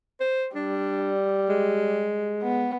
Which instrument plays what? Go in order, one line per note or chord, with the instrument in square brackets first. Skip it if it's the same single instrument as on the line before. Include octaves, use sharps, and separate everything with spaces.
[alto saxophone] C5
[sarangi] G3 [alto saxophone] D4
[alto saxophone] G#3
[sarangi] B3